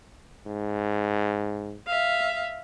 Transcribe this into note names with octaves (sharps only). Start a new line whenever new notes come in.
G#2
E5 F5